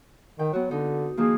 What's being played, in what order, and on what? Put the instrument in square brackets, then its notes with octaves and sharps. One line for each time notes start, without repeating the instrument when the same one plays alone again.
[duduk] D#3 [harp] G5
[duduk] F#3 [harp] B3 F#4
[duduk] D3 [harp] D#4
[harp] D#3 F3 A#3 [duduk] G#4